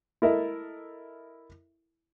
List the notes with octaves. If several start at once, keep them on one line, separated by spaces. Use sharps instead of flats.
E4 A4 A#4 D#5 E5